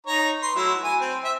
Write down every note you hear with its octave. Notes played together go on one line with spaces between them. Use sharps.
D#4 C#5 A#5
B4 C6
F#3 A3 E4
G#5
C4
E5